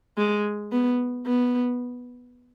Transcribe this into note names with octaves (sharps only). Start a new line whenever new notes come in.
G#3
B3
B3